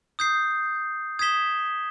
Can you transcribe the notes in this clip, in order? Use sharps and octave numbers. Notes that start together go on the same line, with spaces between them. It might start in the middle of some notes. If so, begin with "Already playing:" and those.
D#6 G6 C7
D#6 G#6 B6 E7 G7